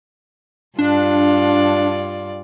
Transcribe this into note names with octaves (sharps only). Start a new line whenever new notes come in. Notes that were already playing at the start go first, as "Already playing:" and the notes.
G2 D4 F4 D5